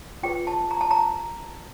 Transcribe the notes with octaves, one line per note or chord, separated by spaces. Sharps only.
F4 G#4 B4 G5
A5
A#5
A5
A#5